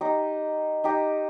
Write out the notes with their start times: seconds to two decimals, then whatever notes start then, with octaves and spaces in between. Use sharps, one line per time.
0.01 D#4 G4 D#5
0.84 D#4 G4 D#5